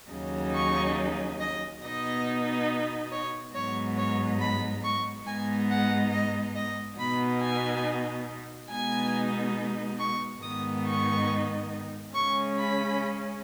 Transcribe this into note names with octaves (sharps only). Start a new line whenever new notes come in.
D#2 C#3 F#3 D#4
C#6
D#5
B2 B3 D#4 D#5
C#5
G#2 F#3 B3 D#4 C#5
C#5
B5
C#6
G#2 G#3 B3 D#4 G#5
F#5
D#5
D#5
B2 B3 D#4 B5
G#5
B2 G#3 B3 D#4 G#5
C#6
G#2 D#3 B3 D#4 D#6
C#6
C#3 G#3 C#4 C#6
B5